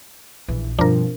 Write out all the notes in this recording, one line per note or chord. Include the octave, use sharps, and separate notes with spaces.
A#1 E3
G2 B2 F3 C4 D4 A#4